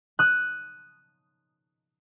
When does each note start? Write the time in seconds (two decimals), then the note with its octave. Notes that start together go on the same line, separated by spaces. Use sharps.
0.19 D#6 F#6